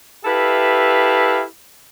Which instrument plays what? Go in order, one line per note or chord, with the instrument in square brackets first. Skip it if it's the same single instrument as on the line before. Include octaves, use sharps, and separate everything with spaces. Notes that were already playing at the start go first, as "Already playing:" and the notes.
[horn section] E4 G4 A4 B4 E5 F5